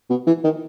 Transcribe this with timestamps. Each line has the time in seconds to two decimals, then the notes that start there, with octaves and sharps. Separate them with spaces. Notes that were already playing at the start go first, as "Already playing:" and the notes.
0.10 B2
0.27 E3
0.44 D#3